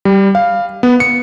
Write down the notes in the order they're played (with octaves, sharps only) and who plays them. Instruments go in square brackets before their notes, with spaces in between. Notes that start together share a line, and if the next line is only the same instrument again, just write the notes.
[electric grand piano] G3
F5
B3
C#7